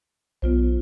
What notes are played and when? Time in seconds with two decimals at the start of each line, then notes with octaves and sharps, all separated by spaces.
0.42 B1 B3 F4 C5